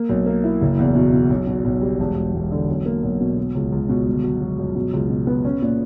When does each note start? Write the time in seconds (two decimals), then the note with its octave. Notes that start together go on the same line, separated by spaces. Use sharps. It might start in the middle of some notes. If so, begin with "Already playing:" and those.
Already playing: A#3
0.09 B1
0.26 A#3
0.44 E4
0.61 F#1
0.79 E2
0.95 B2
1.13 B2
1.30 B1
1.47 B2
1.65 B1
1.81 G3
2.00 E1
2.17 E1
2.34 E1
2.51 D3
2.68 B1
2.86 A#3
3.03 B1
3.21 B2
3.37 B2
3.55 C#2
3.72 C#2
3.89 B2
4.06 G1
4.24 F#3
4.41 F#3
4.59 F#2
4.75 B2
4.93 C#2
5.10 B2
5.27 B3
5.45 C#4
5.62 A#2